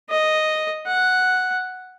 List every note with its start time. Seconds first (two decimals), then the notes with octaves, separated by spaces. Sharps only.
0.10 D#5
0.87 F#5